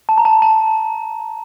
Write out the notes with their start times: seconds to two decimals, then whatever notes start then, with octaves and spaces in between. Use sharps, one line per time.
0.09 A5
0.18 A#5
0.25 A5
0.42 A5